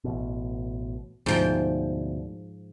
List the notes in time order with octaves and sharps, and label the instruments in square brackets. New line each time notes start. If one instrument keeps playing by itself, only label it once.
[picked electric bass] A1 B2
[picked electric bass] D2 B2 [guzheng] G#2 F3 G5